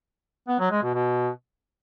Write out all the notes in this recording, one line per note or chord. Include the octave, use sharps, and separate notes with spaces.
B3
F#3
G#3
B2
B2